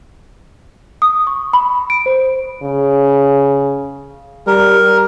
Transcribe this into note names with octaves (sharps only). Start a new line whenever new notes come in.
D#6
C#6
B5
D7
C5
C#3
G3 A#4